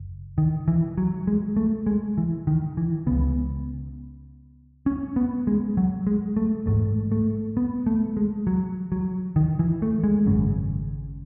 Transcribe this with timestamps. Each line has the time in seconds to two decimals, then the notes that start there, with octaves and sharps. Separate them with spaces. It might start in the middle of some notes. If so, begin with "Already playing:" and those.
Already playing: F#1
0.38 D#3
0.68 E3
0.98 F#3
1.27 G#3
1.57 A3
1.87 G#3
2.18 E3
2.47 D#3
2.77 E3
3.07 C#2 C#3 B3
4.86 C#4
5.16 B3
5.47 G#3
5.77 F#3
6.07 G#3
6.37 A3
6.66 A1 G#2 A3
7.12 A3
7.57 B3
7.86 A3
8.17 G#3
8.47 F#3
8.92 F#3
9.36 D#3
9.59 E3
9.82 A3
10.04 G#3
10.26 G#1 F#2 C#3